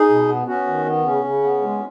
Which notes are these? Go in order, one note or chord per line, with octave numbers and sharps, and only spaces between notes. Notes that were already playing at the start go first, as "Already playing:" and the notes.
Already playing: D#4 G#4
B2
B3
B3 C#4 F#4
D#3
B3
C#3 C#4
C#3
B3
G#3